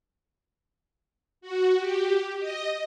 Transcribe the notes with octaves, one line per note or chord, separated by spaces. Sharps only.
F#4
G4
D#5